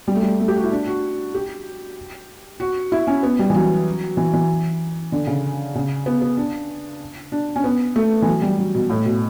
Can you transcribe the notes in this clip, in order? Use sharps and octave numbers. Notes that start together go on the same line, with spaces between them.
G3
A3
G3
A3
G4
F#4
E4
D4
F#4
G4
F#4
E4
C#4
B3
G3
E3
F#3
E3
E3
D3
C#3
C#3
B3
B3
D4
D4
C#4
B3
A3
E3
F#3
G3
F#3
B2
A2
B2